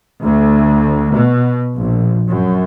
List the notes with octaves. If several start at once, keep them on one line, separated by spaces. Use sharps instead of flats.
D2
B2
A#1
F#2